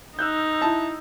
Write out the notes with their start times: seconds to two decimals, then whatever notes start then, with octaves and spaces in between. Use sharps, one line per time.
0.19 D#4 E6 F#6 G6
0.61 E4 A5